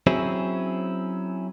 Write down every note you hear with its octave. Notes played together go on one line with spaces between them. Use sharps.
F#3 C4 C#4 E4 G#4